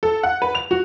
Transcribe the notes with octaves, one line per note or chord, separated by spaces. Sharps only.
A4
F#5
B4
F7
F#4